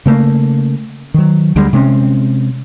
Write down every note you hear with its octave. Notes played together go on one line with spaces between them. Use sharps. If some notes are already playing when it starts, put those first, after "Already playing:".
C#3 A3 A#3
D#3 F#3
D2 D3 G3 G#3
C3 G#3 C4 C#4